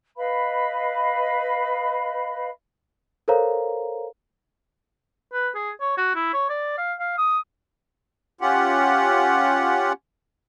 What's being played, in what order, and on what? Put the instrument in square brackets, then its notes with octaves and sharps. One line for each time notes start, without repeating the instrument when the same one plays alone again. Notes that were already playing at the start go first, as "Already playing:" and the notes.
[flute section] B4 D#5 F5 B5
[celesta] A4 A#4 C5 C#5 F5 A#5
[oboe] B4
G#4
C#5
F#4
E4
C#5
D5
F5
F5
D#6
[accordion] C#4 F4 G4 F#5